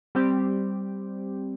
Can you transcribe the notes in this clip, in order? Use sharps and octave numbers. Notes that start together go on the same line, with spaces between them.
G3 C4 G4